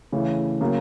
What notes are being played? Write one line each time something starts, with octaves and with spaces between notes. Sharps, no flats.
C#3 E3 A3
C#3 F#3 A#3